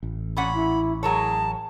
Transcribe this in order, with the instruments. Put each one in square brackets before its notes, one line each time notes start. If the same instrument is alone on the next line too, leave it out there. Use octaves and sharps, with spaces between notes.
[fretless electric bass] A1
[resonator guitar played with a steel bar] A#2 C#4 F#5 [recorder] B5
[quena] E4
[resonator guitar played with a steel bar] F#3 A#4 C#5 [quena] G#4 [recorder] A5